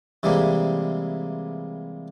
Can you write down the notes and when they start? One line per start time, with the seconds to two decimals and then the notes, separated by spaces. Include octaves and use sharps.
0.23 C3 E3 G3 G#3 A#3